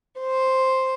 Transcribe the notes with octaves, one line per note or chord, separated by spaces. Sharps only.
C5